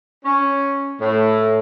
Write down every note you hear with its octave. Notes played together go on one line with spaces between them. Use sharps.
C#4
A2